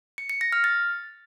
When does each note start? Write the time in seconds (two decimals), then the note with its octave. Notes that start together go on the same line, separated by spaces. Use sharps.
0.18 C#7
0.30 C#7
0.41 A#6
0.52 F6
0.64 A6